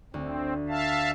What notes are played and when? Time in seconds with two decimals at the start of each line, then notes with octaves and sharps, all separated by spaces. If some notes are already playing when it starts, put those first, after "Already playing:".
0.14 D2 C4
0.69 E5 F5 A5